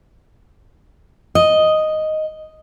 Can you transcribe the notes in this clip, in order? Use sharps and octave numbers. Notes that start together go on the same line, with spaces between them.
D#5